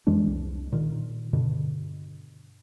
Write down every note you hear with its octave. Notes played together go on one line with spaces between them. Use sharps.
F2 E3 G#3 D4
C2
A#2 D#3
G2 B2 D3